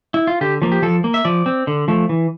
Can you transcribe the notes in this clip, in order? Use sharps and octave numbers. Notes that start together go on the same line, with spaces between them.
E4
F4
D3 G4
F3 A#3
G4
F3 A4
A#3
E5
F3 D5
C4
D3
F3 A3
E3